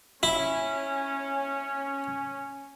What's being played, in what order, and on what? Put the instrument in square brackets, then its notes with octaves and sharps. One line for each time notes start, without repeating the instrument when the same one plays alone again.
[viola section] C#4 [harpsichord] E4